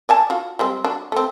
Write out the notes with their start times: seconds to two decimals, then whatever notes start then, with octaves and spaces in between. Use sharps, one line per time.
0.09 D5 G#5 A5
0.30 F4 F#4
0.59 G3 G#3 C4
0.84 D4 F#4
1.12 A3 C4